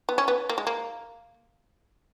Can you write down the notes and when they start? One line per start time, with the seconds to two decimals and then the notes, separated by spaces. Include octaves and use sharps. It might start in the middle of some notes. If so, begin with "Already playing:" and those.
0.09 B3
0.18 C#4
0.28 B3
0.49 A#3
0.58 G#3
0.67 A#3